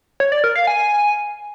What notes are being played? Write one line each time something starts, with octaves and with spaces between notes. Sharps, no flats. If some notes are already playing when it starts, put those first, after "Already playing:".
C#5
D5
A#4
F5
G#5